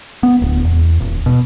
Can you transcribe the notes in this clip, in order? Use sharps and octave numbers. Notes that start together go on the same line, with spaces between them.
B3
D1
E2
D#1
B2